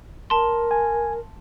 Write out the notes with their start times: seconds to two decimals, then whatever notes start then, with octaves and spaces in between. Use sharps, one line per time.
0.30 A#4 A5 C6
0.71 G#5